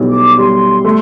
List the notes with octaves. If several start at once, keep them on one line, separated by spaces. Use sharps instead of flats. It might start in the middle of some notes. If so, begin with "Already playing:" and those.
Already playing: B1 A2 G3
D6
G3 C6
A3